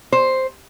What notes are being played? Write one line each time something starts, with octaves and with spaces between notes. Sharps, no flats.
C5